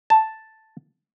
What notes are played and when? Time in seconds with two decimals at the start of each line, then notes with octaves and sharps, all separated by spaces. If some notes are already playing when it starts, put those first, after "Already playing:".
0.10 A5